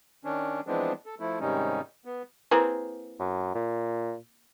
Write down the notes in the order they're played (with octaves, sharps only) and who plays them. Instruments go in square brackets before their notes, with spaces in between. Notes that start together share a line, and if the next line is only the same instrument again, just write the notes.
[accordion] D#3 C#4 D4
E3 F3 G#3 B3 C4 D4
A4
F3 A3 E4
G#2 C3 D#3 G3 C#4 D#4
B3
[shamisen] A#3 C4 G#4 [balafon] E4 B4 A#5
[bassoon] F#2
A#2